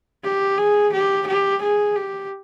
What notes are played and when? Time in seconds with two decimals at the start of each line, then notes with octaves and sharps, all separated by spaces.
0.24 G4
0.58 G#4
0.93 G4
1.27 G4
1.62 G#4
1.96 G4